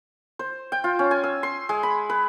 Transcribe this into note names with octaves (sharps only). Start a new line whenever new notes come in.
C5
G5
F4
C#4
G#5
E6
C6
G#3
B5
B4